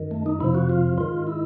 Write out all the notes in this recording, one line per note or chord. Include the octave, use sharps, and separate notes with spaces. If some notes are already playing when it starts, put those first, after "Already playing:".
Already playing: F#2 D#3
A3
D#4
F2 C3 F3 E4
F#4
F4
G#2 D#3 F4
E4